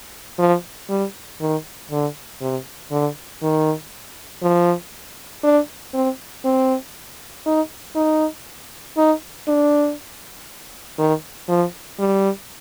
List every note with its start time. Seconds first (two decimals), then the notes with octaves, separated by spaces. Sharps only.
0.39 F3
0.89 G3
1.41 D#3
1.91 D3
2.41 C3
2.91 D3
3.42 D#3
4.43 F3
5.43 D4
5.94 C4
6.45 C4
7.46 D#4
7.96 D#4
8.97 D#4
9.48 D4
10.98 D#3
11.49 F3
11.99 G3